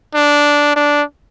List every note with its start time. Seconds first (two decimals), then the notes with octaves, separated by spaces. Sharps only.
0.15 D4
0.76 D4